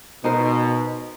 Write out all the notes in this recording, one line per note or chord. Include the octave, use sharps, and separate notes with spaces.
B2 D#4 A#4 C5